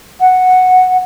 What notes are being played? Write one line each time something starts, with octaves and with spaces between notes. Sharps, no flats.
F#5